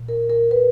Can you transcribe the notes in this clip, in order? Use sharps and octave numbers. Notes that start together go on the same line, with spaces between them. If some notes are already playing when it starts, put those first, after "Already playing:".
Already playing: A#2
A#4
A#4
B4